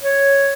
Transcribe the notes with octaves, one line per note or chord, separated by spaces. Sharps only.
C#5